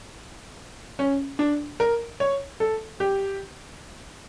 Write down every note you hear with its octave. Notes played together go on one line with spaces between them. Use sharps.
C#4
D4
A#4
C#5
A4
G4